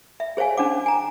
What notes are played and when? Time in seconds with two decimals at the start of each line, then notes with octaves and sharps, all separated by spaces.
0.20 E5
0.37 G#4 C5 C#5 F5 G#5
0.57 C#4 D4 C5 F#5 D6
0.86 G#5 A#5